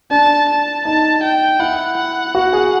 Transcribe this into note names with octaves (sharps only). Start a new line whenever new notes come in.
D4 A5
A5
D#4 A5
G5
E4 F#5
F#5
F#4
G#4